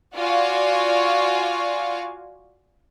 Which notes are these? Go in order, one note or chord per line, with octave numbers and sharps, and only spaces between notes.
F4 F#4 D5 F5 G#5 C#6